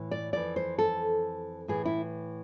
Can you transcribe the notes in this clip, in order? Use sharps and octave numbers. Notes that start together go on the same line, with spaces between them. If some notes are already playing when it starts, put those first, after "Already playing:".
Already playing: A2 E3
D5
F2 E3 D5
C5
A4
A2 E3 G#4
E4